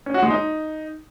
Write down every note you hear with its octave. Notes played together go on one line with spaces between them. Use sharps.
C#4
F#4
G#3
D#4